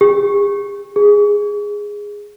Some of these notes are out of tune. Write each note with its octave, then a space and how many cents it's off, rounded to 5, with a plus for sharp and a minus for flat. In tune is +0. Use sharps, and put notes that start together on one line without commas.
G#4 -45
G#4 -10